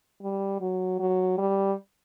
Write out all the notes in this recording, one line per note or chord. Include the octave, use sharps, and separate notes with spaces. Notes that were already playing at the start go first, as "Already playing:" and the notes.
G3
F#3
F#3
G3